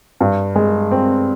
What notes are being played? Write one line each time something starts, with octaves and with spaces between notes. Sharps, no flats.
G2
G#3
C4